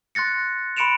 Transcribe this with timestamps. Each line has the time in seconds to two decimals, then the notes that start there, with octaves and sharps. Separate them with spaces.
0.15 C6 F#6 A6 A#6 C#7
0.77 B5 C6 C#7 D7 E7 F7